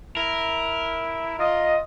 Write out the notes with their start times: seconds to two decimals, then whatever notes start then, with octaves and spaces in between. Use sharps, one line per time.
0.17 E4 A#4
1.39 F4 D#5